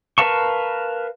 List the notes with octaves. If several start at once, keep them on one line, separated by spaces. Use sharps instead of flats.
A#4 B4 F5 A5 C#6